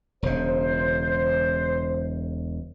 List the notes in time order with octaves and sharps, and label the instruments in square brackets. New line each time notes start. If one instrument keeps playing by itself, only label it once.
[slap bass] E1 C#3 [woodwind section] C5